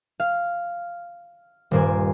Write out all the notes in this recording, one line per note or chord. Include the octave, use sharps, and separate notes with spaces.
F5
D#1 G2 A#4 C5 D5 G#5